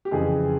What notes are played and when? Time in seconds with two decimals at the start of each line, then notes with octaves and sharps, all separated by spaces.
0.05 G4
0.11 F2 C#3 E3 G#4